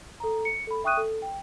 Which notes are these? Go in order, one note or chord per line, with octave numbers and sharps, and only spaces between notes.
A4 A#5
C#7
A4 B5
E5 G5 C#6 D#6 F#6 D#7
A4
G5